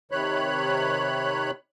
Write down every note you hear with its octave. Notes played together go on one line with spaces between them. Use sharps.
C3 D#3 C#5 B5 F#6